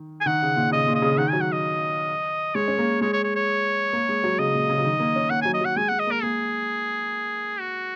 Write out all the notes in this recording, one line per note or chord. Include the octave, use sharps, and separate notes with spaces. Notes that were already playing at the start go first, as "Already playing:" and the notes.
Already playing: D#3
G#5
D#3 F#5
C#3
A#2
C#3 D#5
A#2
D#5
C#3
D#3 F#5
F#3 G#5
F#5
D#5
G#3 C#5
C#4
A#3
G#3 C#5
C#5
C#5
C#5
A#3
G#3
F#3
C#3 D#5
A#2
C#3
F#3
D#3
A#3
C#4
A#3 F#5
F#3 G#5
D#5
F#3 F#5
G#3 G#5
G#3 F#5
D#5
A#3 A#4
A#3 G#4
F#4